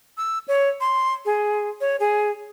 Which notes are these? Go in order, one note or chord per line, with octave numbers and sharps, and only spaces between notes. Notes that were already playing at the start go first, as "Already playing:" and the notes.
E6
C#5
C6
G#4
C#5
G#4